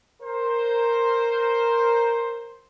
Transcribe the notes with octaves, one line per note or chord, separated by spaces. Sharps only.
A#4 C5